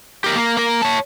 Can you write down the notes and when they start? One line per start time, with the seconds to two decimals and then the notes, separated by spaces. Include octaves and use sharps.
0.24 G4 A#4
0.36 A#3
0.57 A#3 A#4
0.82 C#5 A5